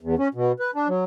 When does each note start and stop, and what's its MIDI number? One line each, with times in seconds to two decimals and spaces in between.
0.01 0.15 40
0.19 0.28 61
0.34 0.52 47
0.60 0.71 71
0.75 0.88 62
0.88 1.04 54